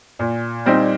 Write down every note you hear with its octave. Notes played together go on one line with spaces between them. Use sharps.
A#2
G3 C4 D#4